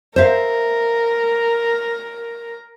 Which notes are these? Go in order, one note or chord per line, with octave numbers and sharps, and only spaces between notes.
A#4 C5 E5 F5